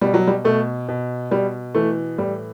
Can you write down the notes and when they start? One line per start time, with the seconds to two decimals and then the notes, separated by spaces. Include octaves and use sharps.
0.01 B2 G3
0.14 F#3
0.27 G3
0.44 B2 A3
0.88 B2
1.31 B2 G3
1.74 E3 A3
2.18 A2 G3